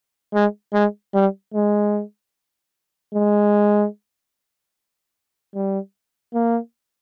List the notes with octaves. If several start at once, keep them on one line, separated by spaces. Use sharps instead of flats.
G#3
G#3
G3
G#3
G#3
G3
A#3